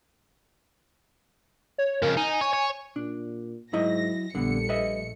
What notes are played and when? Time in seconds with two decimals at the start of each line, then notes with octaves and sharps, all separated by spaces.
1.78 C#5
2.02 F2 C#3 A#4
2.17 D#4 G#5
2.41 C#5
2.53 C#5
2.96 A#2 D4
3.73 G#2 F#3 E4 D#5 A#6
4.35 A#1 D3 G3 A3 B3 C#7
4.69 B4 D#5 E5